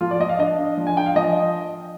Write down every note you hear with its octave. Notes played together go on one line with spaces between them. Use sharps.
F3 F4
D5
F3 D#5
F5
D4 D#5
D4
F3
G#5
D4 G5
F5
F3 D#5